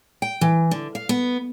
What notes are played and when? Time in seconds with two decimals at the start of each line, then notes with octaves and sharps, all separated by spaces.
0.22 G5
0.41 E3
0.71 D3
0.95 F5
1.09 B3